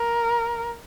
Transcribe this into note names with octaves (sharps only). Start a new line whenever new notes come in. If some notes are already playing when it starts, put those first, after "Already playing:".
Already playing: A#4